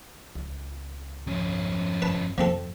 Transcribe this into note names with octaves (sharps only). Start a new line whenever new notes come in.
C#2
F2 C#4
F#1 B4 A5
F2 F3 C4 A4